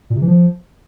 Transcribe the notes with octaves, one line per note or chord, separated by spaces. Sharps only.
A#2
C3
E3
F3